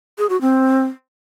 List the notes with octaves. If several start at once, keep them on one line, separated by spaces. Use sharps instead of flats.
G#4
F#4
C4